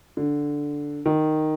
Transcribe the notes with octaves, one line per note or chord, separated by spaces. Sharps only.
D3
D#3